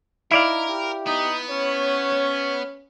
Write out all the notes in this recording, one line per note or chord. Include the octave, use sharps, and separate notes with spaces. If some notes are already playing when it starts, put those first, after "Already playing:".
D#4 E4 A#4 D5 F5
G4
B3 D#4
C#4 C#5